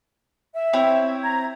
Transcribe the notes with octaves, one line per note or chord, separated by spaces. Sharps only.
E5
C4 E4 C#5
A#5 G#6